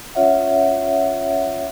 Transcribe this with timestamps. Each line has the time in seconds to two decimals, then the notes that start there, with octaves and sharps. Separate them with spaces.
0.15 C#4 F4 C#5 E5 F#5